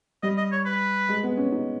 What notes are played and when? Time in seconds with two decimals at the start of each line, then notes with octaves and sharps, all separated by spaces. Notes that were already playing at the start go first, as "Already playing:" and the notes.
0.23 G3 D#5
0.37 D#5
0.52 C#5
0.66 B4
1.09 G#3
1.23 B3
1.37 C#4
1.52 D#4